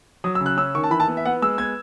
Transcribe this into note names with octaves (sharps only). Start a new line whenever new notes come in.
F#3 D#6
E6
C#3
F#6
C#4 E6
D#3 C#6
A5
E3 B5
A5
B3
E5
B3 F#5
G#3 E6
B3 G#6